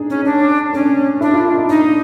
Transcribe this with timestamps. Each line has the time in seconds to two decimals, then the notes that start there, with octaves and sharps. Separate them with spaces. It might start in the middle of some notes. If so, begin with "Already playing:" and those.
Already playing: D4 D#4 G#4
0.10 C#4
0.25 C#4 D4
0.73 C#4 D4
1.21 D4 E4
1.33 F4
1.45 E4
1.57 D#4
1.69 D4 D#4